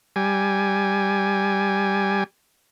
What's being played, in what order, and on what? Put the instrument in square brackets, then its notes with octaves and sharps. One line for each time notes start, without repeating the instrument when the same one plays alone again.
[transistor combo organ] G3 G#5